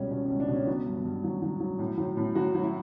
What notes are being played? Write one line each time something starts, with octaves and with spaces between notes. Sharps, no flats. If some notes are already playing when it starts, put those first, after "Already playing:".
Already playing: C#2 B2 G3 C#4
B2 C#4
C#4
C#2
D4
B2
C#4
F#3 B3
G2
B3
G2
F#3
F#3
F#3
A2
F#3
A2
F#3 F#4
F#3
E4